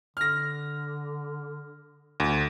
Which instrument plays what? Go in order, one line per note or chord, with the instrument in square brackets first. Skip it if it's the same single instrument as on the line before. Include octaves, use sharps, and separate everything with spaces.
[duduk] D3 [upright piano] F6 A#6
[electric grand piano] D2